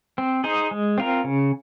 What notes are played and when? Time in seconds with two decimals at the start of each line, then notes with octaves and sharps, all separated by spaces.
0.18 C4
0.44 D#4 G#4 C5
0.71 G#3
0.98 C4 F4 A#4
1.24 C#3